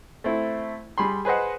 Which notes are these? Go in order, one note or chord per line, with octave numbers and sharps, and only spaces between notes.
A3 C4 E4
G3 G#4 B5 C6
G#4 B4 C5 D#5 F#5